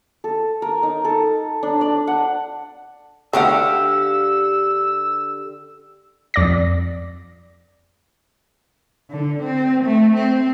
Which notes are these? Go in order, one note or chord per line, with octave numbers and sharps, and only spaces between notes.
A4
A#4
D#4
A4
D4
D5
F#5
D3 A3 D4 G4 F5 F#5 E6
F2 D5 A#6
D3
C4
A3
C4